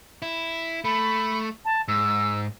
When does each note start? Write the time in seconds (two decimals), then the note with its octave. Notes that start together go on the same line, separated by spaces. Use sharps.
0.22 E4
0.85 A3 B5
1.65 A5
1.88 G#2 E6